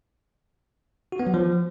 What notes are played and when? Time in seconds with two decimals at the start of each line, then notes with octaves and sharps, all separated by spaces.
1.12 F#4
1.20 B3
1.27 F#3
1.34 F3